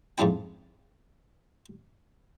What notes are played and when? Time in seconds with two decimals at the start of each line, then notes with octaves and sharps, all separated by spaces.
0.18 F2 G#2 C#3 D4 E4 G5